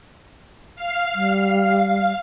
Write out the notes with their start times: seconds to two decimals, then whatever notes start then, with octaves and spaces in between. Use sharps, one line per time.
0.75 F5
1.15 G3